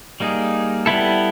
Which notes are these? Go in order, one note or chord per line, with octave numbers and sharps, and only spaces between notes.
G3 A#3 D#4 G#4
G3 B3 E4 A4